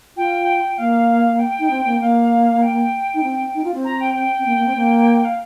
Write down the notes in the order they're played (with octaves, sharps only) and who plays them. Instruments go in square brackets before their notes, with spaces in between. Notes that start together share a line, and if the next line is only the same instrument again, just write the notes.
[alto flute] F4 [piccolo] G5
[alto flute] A#3 [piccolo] F5
[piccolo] G5
[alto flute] D#4
C4
A#3
[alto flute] A#3 [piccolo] F5
[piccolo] G5
[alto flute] D#4
C4
D#4
F4
C4
[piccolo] A#5
G5
G5
[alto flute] C4
A#3
A#3
C4
A#3
[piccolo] F5